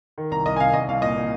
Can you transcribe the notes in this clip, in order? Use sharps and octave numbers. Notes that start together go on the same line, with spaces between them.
D#3
C2 A#5
C2 D#5
G#5
C3 F5
C2 D#5
C2 F5
A#2 D#5
A#2